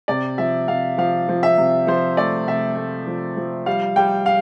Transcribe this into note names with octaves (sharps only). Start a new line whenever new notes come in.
C3 D5
F3 E5
C3 F5
F3 F5
F3
E5
C3
F3 C5
A3 D5
C3 E5
A3
F3
F3
G3 F5
G3 G5
F5